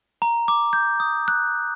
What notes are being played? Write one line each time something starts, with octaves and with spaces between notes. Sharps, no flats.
A#5
D6
G6
D#6
F#6